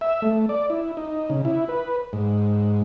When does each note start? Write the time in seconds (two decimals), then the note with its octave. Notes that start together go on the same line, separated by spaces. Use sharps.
0.01 E5
0.22 A3
0.49 D5
0.70 E4
0.97 D#4
1.30 C#3
1.45 E4
1.69 B4
2.13 G#2